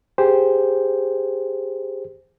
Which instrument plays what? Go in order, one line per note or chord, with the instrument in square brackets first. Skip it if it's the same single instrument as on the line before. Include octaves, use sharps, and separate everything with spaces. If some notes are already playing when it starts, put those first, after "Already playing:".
[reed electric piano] G4 G#4 C5